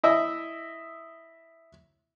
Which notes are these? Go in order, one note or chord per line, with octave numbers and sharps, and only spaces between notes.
E4 D#5 E5